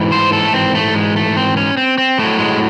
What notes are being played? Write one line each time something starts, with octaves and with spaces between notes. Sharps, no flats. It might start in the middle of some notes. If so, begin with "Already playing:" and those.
Already playing: G#2 E3
C5
A4
A3
C4
A3
G#3
A3
C4
C#4
C4
C4
A2 F#3 A3
G#3